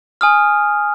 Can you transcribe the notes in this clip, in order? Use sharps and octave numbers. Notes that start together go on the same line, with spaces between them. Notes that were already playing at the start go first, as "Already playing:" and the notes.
G#5 D#6 F6